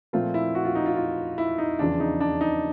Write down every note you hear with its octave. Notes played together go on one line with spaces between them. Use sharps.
A#2 F3 A3 C4 F4
E4
F#4
F4
D#4
F4
F4
E4
D#4
E2 C#3 F3 D4
D#4
D4
D#4